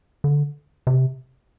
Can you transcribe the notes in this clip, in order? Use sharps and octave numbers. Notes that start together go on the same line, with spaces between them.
D3
C3